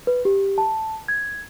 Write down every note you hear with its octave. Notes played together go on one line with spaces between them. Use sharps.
B4
G4
A5
G#6